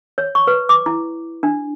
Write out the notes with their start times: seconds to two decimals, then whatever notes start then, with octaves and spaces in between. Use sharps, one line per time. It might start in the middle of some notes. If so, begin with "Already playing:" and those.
0.18 C#5
0.35 C#6
0.47 B4
0.69 D6
0.86 E4
1.43 D4